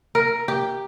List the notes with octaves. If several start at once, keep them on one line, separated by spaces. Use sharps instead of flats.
A#4
G4